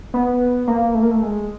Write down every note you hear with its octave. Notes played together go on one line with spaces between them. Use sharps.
B3
A#3
A3
A#3
A3
G#3